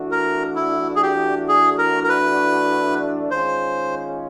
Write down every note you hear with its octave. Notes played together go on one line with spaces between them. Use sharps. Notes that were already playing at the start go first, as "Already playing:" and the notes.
Already playing: E3 A3 D4 F#4
A#4
E4
G#4
G4
G#4
A#4
A#4
B4
D#3 G#3 C#4 F4 C5